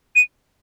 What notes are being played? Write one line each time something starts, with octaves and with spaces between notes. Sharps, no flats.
D#7